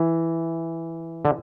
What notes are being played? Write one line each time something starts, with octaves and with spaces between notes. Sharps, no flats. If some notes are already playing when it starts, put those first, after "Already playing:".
Already playing: E3
D3